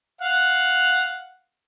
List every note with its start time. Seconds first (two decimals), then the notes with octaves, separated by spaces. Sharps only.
0.21 F5 F#5